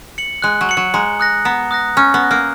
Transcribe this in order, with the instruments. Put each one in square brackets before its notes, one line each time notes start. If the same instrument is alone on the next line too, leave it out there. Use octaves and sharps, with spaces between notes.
[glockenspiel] C#7 F#7
[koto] G#3 [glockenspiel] F#6
[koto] F#3
[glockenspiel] C#7 F#7
[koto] F#3
[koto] G#3 [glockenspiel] A#5
[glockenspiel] D#6 F#6 A#6
[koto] B3 [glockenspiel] A#5
[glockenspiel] D#6 F#6 A#6
[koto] C#4 [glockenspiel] A#5
[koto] B3
[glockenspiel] D#6 F#6 A#6
[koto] A#3